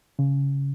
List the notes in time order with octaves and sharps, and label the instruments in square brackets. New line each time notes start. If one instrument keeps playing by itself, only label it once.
[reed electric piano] C#3